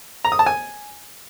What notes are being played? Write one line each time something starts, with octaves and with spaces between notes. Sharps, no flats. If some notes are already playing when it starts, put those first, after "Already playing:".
A#5
D#6
A5
G#5